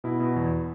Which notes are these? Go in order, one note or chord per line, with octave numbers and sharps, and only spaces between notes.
B2 E4
B2
E2